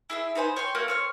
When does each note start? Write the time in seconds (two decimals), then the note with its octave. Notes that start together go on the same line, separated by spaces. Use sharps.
0.10 E4 G#4 E5
0.35 D#4 B4 C5 G#5
0.56 C#5 G5 C6
0.75 A#3 F#4 A4
0.88 C4 C#5 F6